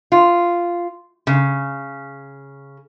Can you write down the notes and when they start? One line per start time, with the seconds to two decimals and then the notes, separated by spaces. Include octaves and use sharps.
0.12 F4
1.27 C#3